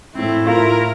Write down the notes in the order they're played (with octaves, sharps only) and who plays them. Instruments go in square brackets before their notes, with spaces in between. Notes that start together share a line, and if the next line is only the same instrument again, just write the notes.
[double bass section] A2 [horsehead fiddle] A3 E4 [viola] C4
[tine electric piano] F4 [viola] A#4